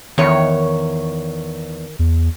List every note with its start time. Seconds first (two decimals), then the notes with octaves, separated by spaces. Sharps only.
0.18 E2 D#3 C#5
1.99 E2